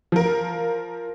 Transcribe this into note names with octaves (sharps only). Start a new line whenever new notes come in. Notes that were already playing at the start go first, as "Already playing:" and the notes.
F3 A#4